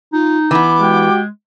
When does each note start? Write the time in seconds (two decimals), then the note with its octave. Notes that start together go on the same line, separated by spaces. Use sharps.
0.13 D#4 F4
0.51 E3 B3 D6
0.80 G#3 F#4 G4 G5